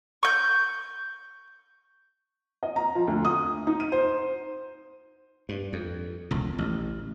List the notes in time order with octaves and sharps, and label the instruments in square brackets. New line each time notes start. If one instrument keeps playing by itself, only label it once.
[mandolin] C#6 G6
[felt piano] D#5
A#5
F3
D2
D#6
D#4
D#7
C5
[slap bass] G2
F2
E1 C#2
A1